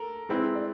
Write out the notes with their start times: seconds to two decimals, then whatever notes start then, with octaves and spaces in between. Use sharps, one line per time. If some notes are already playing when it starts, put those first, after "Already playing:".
Already playing: A4 A#4
0.29 G#3 C4 E4 B4
0.55 D5